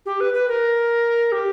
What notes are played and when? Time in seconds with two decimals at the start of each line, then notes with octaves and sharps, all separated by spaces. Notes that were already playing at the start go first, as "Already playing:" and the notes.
0.06 G4
0.20 B4
0.34 B4
0.48 A#4
1.32 G4